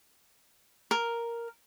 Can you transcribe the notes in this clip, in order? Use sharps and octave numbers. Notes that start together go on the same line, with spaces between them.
A#4